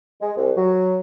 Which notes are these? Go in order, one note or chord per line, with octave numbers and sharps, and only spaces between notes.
G#3
C2
F#3